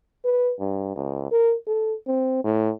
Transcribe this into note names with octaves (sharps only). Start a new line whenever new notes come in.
B4
G2
C#2
A#4
A4
C4
A2